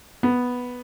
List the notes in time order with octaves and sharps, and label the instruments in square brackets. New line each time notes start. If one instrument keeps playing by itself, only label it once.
[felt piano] B3